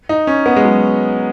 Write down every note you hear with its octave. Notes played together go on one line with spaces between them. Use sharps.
D#4
C#4
B3
G#3
F#3